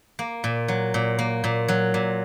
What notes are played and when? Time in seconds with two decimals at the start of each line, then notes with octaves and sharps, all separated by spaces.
0.19 A#3
0.44 A#2
0.68 F#3
0.94 A#2
1.19 A#3
1.44 A#2
1.68 F#3
1.94 A#2